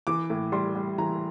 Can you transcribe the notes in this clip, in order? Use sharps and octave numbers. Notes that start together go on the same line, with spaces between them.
E3 D6
A2
G3 C6
G3
E3 A#5